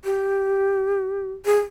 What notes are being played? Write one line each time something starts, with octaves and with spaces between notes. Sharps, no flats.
G4
G#4